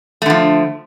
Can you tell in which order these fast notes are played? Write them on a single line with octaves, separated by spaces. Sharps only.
A3 D3 F3